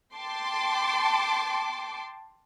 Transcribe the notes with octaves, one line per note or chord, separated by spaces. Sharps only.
G5 A5 C6 D6